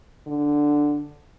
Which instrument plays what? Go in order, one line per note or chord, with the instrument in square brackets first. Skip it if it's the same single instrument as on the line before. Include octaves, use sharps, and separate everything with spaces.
[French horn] D3